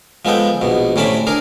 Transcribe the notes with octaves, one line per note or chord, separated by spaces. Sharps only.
F3 G#3 B3 A4 G5
A#1 B2
A2 C3 C#4 D5 A5 B5
D4 G#4 A#4